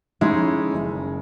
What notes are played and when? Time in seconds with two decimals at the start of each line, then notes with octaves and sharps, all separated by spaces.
0.21 G#3 C#4 D#4 E4
0.73 F#1